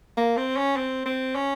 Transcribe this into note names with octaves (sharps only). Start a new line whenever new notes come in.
A#3
C4
C#4
C4
C4
C#4